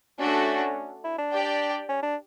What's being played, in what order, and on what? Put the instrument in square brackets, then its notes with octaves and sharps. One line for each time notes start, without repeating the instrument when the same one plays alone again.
[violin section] A3 D4 F#4 A4 [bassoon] C#4
[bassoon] E4
D4
[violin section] G4 D5 G5
[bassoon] C#4
D4